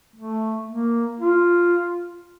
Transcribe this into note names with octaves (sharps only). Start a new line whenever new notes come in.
A3
A#3
F4